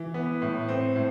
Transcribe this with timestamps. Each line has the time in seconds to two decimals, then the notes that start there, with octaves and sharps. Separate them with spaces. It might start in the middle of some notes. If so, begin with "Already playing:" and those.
Already playing: E3
0.14 B3
0.42 A2
0.68 C4
0.96 A2